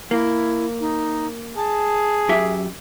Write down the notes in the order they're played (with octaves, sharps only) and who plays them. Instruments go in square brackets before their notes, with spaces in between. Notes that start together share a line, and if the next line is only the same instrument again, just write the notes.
[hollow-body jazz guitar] A#3 [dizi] E4
[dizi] D#4
[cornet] G#4 [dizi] A5
[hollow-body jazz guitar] F#2 G4 E5